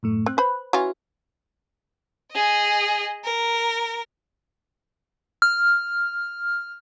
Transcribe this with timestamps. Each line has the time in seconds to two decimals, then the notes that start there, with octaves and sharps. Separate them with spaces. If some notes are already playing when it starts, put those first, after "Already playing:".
0.03 F#2 A2 A3
0.26 C4 F#6
0.38 B4 C5 B5
0.73 E3 C#4 F4 F#4
2.32 G#4 D#5
3.25 A#4
5.42 F6